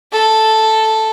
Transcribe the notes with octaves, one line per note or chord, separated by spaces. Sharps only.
A4